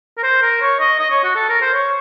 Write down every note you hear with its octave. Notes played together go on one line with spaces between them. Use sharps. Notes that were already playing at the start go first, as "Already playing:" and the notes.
A#4
C5
A#4
C#5
D#5
D#5
C#5
F#4
A4
A#4
C5
C#5